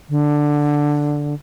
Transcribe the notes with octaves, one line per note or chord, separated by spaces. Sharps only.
D3